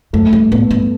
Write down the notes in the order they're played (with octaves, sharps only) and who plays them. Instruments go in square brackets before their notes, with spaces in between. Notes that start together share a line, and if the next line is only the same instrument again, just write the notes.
[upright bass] F#2 [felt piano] A3
[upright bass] G2
[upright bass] A2 [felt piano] B3
[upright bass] G2